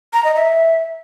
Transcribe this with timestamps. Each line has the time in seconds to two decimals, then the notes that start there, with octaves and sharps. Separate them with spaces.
0.13 A#5
0.24 D#5
0.35 E5